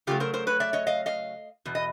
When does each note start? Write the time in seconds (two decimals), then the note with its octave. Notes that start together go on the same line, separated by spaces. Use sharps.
0.07 C#3 F#3 A3 F4 G4
0.20 A#4 C5
0.33 A#4 C5
0.47 B4 C#5
0.60 D5 E5
0.73 C#5 D#5
0.87 D#5 F5
1.06 D#5 F5
1.65 E2 B2
1.75 D#5